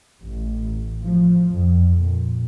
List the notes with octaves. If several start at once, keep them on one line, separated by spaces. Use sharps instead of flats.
A1
F3
F2
A#2